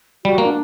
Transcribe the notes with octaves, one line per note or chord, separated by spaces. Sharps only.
G3 F#4
A#3
D4